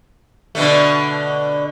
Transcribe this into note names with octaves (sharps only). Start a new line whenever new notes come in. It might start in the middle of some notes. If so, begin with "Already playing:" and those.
B2 D3 A3